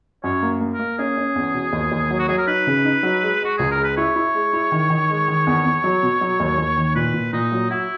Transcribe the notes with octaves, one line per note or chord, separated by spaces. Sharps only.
F#2 C#5
A#3
A#3
A#4
A#3
C#4 G#4
C#4
E2
B2
D#2
D#2
F#3
F#4
F#3 G#4
A#4
D#4 B4
C#3
D#4
F#3
G#3
G#3 F#4
C#2 G#4
A#4
G#3
B4
E4 C#5
E4
G#3
E4
D#3
D#3
G#3
D#3
E2
E2
F#3
B2
F#3
D#2
D#2
D#3
A#2 B4
A#2
A#2 D#4
F#3
E4 F#4